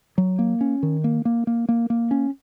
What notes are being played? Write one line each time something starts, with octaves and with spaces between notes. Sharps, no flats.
F#3
A#3
C#4
D#3
A#3
A#3
A#3
A#3
A#3
C#4